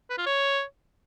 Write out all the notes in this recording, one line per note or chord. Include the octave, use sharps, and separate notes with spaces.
B4
F4
C#5